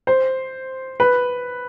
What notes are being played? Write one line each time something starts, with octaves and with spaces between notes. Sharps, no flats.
C5
B4